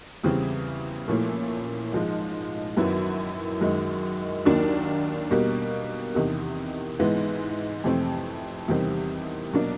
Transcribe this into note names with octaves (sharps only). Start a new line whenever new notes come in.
E2 C#3 E3 G3 C4
A#2 F3 A3 C#4 E4
G#2 F3 G#3
F#2 D#3 F#3 B3 E4
F#2 D#3 G#3
D#2 D#3 F#3 A#3 D4
B2 G3 A#3
E2 C3 D#3
G#2 E3 G#3 B3
F2 C3 E3 A3 C4
E2 C3 D#3 G3 C4
B2 F#3 A#3 D4